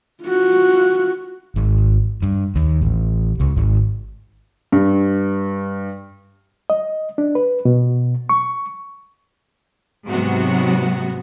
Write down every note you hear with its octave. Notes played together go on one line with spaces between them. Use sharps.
F4 F#4
G#1
G2
D#2
A1
C#2
G#1
G2
D#5
D4
B4
B2
C#6
G#2 C3 F#3 B3 F#4